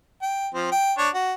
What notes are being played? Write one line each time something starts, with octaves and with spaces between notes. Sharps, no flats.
G5
F3 C4
G5
D4 C#5
F#4